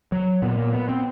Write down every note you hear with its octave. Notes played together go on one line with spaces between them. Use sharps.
F#3
A#2 B3
A#3
B3
C4